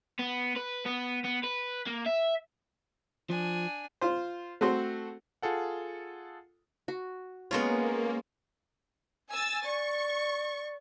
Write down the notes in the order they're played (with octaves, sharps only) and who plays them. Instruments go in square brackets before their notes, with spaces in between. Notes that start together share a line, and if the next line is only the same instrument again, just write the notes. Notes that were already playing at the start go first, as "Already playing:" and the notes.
[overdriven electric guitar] B3
B4
B3
B3
B4
A#3
E5
[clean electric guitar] F3 [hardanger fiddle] D4 G#5
[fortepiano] F4 C5
A3 C4 F#4 C5
[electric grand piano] F4 G#4 A4 F#5
[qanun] F#4
[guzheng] G#3 C#4 F4 [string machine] A#3 [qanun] B3 A#4 C#5
[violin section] G#5 E6 A6
[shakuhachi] D5 [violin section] C#6